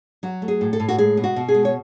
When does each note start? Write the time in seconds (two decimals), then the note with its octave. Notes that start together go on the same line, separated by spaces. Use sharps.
0.23 F#3 F#4
0.42 A3
0.48 G#4
0.61 A2
0.73 A4
0.80 A2
0.88 F#4
0.98 G#3 G#4
1.17 B2
1.24 F#4
1.36 B2
1.49 G#4
1.55 G#3
1.65 C#5